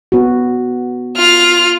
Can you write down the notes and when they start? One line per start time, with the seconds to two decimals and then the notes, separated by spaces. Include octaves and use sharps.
0.12 B3 F#4
1.17 F4 F6